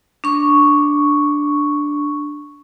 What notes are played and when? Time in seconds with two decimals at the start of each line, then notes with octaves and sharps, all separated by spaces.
0.24 D4 C#6